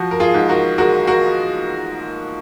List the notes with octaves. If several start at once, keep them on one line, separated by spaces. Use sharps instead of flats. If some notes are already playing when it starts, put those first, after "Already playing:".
Already playing: F3 F#4
A#4
F4 G#4
G#2
F#4 A#4
G#3 F#4 A#4
F#4 A#4